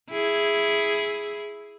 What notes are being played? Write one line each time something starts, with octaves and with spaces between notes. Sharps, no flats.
E4 G#4